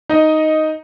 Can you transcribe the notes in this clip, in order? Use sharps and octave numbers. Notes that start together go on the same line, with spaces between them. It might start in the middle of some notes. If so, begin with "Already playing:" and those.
D#4 D#5